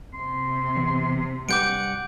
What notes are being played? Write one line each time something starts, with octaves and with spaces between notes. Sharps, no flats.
C3 C6
E2
G2 G4 B4 F#5 D6 G6 D7